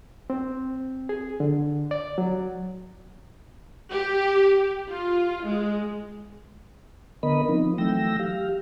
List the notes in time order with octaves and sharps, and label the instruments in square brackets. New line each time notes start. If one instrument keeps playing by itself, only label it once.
[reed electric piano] C4
G#4
D3
D5
F#3
[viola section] G4
F4
G#3
[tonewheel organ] D3 B3 A#4 D#5 B5
F3 C4 D#4
E3 F#3 A3 G5 E6 A#6
G4 F5